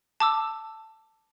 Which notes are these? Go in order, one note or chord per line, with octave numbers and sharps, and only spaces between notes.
A5 D6 E6